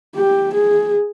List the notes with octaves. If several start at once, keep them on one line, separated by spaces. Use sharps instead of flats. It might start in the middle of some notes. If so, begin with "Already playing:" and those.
G4
G#4